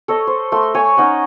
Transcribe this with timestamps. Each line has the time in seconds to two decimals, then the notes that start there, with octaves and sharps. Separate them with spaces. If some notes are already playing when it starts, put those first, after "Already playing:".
0.08 A4 C#5 D#5
0.27 C5
0.52 A3 C6
0.75 C#5 G#5
0.97 C#4 D#4 D#5 F#5